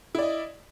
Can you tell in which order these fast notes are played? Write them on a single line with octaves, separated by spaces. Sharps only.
E4 D5 D#5